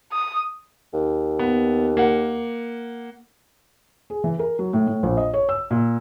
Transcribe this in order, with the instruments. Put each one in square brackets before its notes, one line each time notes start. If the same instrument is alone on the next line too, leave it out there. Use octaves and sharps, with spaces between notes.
[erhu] D#6
[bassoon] D#2
[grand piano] B3
A#3 F#5
[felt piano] G#4
E3
A#4
F#3
A2
A2
A#1
D#5
C#5
E6
A#2